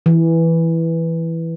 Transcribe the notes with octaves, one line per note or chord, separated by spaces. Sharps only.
E3